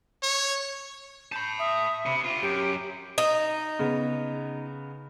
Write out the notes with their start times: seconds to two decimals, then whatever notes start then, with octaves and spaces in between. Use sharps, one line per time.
0.23 C#5
1.32 A5 B5 G6
1.59 E5 D#6
2.06 C3 B5
2.24 F4 G4 D#7
2.42 F#2 G4 D7
3.18 D#4
3.79 C#3 B3